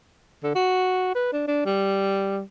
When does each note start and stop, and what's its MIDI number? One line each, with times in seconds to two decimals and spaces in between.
0.44 0.51 50
0.56 1.15 66
1.15 1.32 71
1.33 1.45 62
1.48 1.62 62
1.66 2.41 55